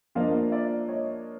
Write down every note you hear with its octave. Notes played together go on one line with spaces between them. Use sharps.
F3 A#3 D4 F4 D#5 F5
D5 E5
C#5 D#5